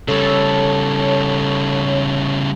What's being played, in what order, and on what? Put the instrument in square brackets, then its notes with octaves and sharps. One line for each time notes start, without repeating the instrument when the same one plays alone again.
[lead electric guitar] C#3 G3 [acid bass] A4 [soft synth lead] C#5